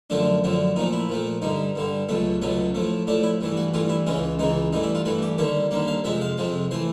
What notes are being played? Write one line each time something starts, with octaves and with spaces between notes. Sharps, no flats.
F#2 D3 F3 A3 D4
F#2 D3 F3 A3
A#2 F3 A3 D#4
E4
A#2 F3 A3
G2 D3 G3 D#4
G2 D3 G3
C#2 B2 F#3 A3
C#2 B2 F#3 A3 C#4
A2 F3 A3
A2 F3 A3 D4
E4
G2 E3 A3
F#4
G2 E3 A3 F4
E4
C#2 C#3 E3 G#3 C#4
C#2 C#3 E3 G#3 D#4
G2 E3 A3 D#4
E4
F4
G2 E3 A3 F#4
G4
D#2 D3 G3 A#3 C#5
D#2 D3 G3 A#3
F5
F2 C3 F3 G#3 E5
F5
F2 C3 F3 G#3
E3 A3 C5